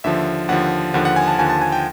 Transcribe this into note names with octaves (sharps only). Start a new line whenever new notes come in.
D#2 D3 F3 E5
D#2 D3 F3 F#5
D#2 D3 F3 F#5
F#5
G#5
A5
D#2 D3 F3 G#5
A5
G#5
G5